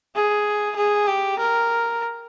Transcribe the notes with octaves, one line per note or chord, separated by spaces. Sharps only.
G#4
G#4
G4
A#4